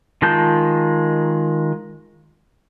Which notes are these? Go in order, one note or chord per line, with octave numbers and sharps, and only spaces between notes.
D#3 G#3 F4 A5 G6